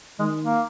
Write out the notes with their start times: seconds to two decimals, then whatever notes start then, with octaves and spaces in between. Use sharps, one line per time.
0.19 D#3 G#3
0.45 A#3